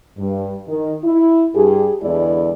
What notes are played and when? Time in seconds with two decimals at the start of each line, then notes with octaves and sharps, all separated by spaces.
0.17 G2
0.67 D#3
1.03 E4
1.55 G2 G4 G#4
2.02 E2 D3 G#3 E4 G#4 D5